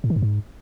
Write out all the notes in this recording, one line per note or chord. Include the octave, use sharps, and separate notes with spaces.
A2
D#3
G2
G#2